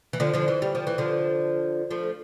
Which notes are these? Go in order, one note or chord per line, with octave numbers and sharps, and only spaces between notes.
E3
D3 F3
D3 F3
E3
G3
F3
E3
D3 F3
F3 A3